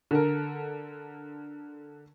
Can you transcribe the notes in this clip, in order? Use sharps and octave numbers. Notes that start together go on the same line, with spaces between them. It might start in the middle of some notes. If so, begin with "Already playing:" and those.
D3 A4 A#4